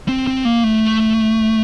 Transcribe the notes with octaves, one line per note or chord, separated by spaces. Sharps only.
C4
C4
A#3
A3